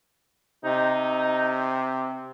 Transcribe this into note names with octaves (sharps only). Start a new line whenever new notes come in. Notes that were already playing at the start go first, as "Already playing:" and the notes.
C3 D#4